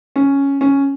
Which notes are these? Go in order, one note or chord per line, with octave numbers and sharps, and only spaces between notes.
C#4
C#4